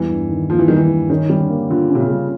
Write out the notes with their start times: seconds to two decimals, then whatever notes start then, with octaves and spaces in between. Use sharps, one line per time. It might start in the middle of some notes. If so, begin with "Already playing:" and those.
Already playing: E2 E3 G3
0.10 G2
0.30 D#3
0.50 F3 A#3
0.58 E3
0.68 D#3 G3
0.77 E3
0.90 G2
1.10 D#3 C#4
1.30 G3
1.40 D3
1.50 A#3
1.70 D3 F4
1.90 C3 C#4
2.00 C#3
2.10 G3